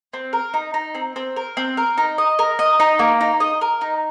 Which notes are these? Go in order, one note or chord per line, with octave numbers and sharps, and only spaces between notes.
C4
A#4
D#4
D#4
C4
C4
A#4
C4
A#4
D#4
D#5
A#4
D#5
D#4
A#3
D#4
D#5
A#4
D#4